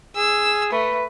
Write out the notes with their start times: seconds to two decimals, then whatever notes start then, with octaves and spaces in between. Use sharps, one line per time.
0.17 G#4 E6
0.72 A3 B4